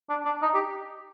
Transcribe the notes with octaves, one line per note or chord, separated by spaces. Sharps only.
D4
D4
D#4
G4